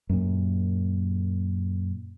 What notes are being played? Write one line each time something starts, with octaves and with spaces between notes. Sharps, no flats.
F#2 A#2